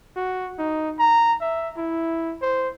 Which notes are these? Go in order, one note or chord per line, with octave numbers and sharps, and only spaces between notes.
F#4
D#4
A#5
E5
E4
C5